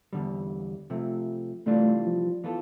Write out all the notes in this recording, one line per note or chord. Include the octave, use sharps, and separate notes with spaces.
E2 D3 G3
C3 F3 A3
C3 E3 G3 A3 D4 F4
F3
E3 B3 F4 A4